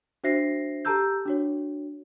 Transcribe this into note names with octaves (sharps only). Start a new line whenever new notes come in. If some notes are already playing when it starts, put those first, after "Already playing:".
D4 F#4 C5 E5 A#6 C7
G4 A4 A5 A#5 E6 G6
D4 F#4 C#5